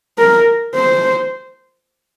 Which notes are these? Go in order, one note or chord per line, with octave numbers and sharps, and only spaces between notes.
A#4
C5